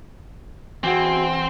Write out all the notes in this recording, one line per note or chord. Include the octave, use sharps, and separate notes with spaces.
E3 C4 F#4 F#5